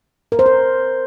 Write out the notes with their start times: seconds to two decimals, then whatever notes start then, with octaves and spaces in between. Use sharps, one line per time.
0.32 A#4
0.39 C5
0.46 A#4